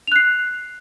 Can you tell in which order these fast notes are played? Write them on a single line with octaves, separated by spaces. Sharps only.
F7 F#6 C7